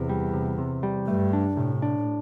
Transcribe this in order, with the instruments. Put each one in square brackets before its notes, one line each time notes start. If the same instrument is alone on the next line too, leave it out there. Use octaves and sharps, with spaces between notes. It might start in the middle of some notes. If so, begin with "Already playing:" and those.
Already playing: [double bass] E2 [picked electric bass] C3
[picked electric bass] G3
C3
C3
G3
[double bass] G2 [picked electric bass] A3
[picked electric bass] D4
[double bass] A2 [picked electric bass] C3
[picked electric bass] D4